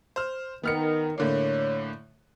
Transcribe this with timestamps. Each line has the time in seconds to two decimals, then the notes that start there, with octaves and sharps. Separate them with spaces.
0.16 C5 F6
0.63 D#3 B3 F6 C#7
1.18 A2 D3 A#3 C#5